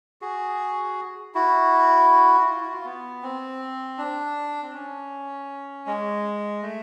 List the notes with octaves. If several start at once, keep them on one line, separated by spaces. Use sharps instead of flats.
F#4 G#4
E4 F#4
E4
F4
E4 F#4
F4
B3
C4
D4
C4
C#4
G#3
A3